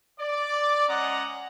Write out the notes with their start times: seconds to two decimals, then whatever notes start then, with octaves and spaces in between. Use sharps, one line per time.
0.19 D5
0.88 G#3 C#4 D#5 F#5 A#5